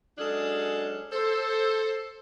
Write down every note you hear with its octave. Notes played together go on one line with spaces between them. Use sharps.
F#3 G#3 C#4 D4 G#4 A4
A4 C5